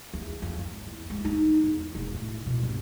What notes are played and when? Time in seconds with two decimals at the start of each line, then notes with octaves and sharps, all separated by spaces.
0.14 E2
0.42 F2
0.57 G#1
0.86 E2
1.10 G#3
1.25 D#4
1.64 E2
1.95 E1
2.15 A2
2.46 B2
2.63 G1